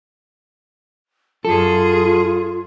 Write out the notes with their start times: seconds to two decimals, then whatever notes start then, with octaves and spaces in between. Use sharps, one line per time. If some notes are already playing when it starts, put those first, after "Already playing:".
1.45 F#2 F4 G#4 A4